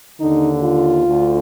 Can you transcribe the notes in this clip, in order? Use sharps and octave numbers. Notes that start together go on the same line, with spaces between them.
D#2 D3 D#4
F4
D2 D3